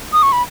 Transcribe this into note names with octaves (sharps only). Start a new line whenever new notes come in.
D#6
C#6
B5